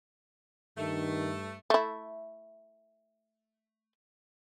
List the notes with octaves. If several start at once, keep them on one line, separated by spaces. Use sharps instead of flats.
G2 D#3 A3
A3 E4